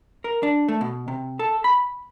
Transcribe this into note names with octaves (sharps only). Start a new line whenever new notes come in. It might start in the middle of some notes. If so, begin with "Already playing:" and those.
A#4
D4
A3
B2
C3
A4
B5